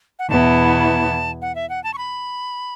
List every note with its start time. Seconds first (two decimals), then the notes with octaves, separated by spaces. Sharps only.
0.19 F#5
0.29 E2 B2 B3 E4 A5
1.42 F#5
1.55 E5
1.70 F#5
1.84 A5
1.94 C#6
1.98 B5